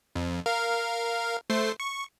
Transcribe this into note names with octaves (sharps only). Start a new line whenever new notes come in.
F2
A#4 F5
A3 C5 C7
C#6